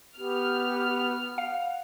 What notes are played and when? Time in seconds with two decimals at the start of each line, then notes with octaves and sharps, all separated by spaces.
0.18 B3 G4 F6
1.38 F5 F#5